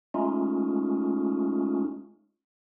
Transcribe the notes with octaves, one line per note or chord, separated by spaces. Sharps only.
G#3 A3 C#4 D#4 F4